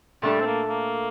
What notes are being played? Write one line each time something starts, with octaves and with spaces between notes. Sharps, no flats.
A#2 G3 A3 D4 A4
C4
A#3
A#3